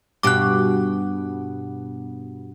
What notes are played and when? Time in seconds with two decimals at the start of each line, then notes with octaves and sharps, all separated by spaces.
0.23 G2 B2 G4 D6 F#6